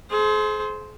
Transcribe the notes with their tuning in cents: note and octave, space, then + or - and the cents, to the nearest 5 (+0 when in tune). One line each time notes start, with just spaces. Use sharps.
G#4 +40 C5 +0